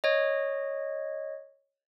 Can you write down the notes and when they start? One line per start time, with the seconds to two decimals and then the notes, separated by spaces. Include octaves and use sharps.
0.04 C#5 D#5